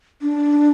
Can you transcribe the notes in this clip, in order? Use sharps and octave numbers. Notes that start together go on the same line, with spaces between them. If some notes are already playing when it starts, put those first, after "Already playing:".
D4